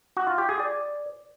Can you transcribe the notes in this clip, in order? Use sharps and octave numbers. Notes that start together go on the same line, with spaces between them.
F#4
F4
G4
G#4
D5